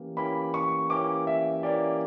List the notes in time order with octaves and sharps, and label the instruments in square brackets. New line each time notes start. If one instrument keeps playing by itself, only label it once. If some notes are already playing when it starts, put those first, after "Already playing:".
Already playing: [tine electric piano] E3 A#3 C#4 G4
[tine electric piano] E3 A#3 C#4 G4 [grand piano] B5
[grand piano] C#6
[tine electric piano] E3 A#3 C#4 G4 [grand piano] D6
[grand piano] E5
[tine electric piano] E3 A#3 C#4 G4 [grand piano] D5